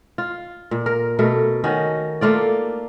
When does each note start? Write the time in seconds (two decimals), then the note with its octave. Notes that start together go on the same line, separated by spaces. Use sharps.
0.18 F4
0.71 A#2
0.86 A#4
1.19 B2 A3 A#4
1.64 D#3 C#4 F#4
2.21 A3 A#3 F4 D5